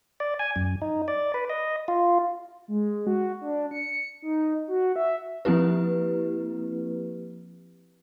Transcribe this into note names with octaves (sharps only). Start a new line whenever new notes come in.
D5
G#5
F#2
D#4
D5
B4
D#5
F4
G#3
F#4
D4
C#7
D#4
F#4
E5
F3 A#3 C4 E4 G4 B4